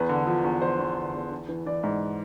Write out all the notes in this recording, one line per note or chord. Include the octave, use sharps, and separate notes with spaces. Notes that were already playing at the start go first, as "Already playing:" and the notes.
Already playing: E2 B4
D3
F3
E2
F3 C5
E2
D3
E2
E3
E3
E3 D5
G#2